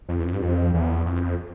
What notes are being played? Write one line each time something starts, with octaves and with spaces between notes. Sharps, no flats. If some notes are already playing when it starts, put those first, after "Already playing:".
F2
E2
F2
G2
F2
E2
F2